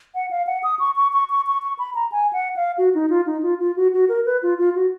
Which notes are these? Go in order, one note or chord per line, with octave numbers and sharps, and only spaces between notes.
F#5
F5
F#5
D#6
C#6
C#6
C#6
C#6
C#6
C#6
B5
A#5
G#5
F#5
F5
F#4
D#4
F4
D#4
F4
F4
F#4
F#4
A#4
B4
F4
F4
F#4